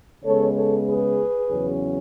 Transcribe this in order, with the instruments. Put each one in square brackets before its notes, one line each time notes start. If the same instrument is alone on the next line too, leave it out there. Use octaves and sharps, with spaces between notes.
[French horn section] C#3 G#3 B3 A4 C#5
A4 C#5
G#4 B4
E2 C#3 F#3 C#4